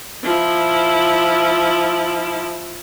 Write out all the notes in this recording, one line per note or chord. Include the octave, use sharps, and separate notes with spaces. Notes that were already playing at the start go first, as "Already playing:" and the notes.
F3 E4